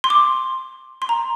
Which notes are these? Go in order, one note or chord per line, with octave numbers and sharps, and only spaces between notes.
C6
D6
C6
A#5